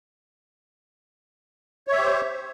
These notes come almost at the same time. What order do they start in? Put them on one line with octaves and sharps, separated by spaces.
C#5 E5 G4 C5